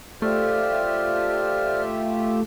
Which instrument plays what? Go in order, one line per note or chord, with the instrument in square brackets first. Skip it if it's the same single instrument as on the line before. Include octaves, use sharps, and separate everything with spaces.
[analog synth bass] A3 [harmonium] F4 G4 E5 [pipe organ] C5 D5 F6